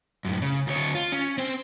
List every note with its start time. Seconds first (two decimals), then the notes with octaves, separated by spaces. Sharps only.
0.25 F#2 A2
0.42 C#3
0.67 D2 C#5
0.95 F4
1.12 C#4
1.38 C4 C5